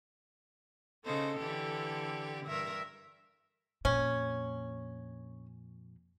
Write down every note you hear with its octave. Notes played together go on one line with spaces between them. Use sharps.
C#3 D#4 A4 C5
D3 E3 G4
G2 A#4 E5
F2 A#2 C#4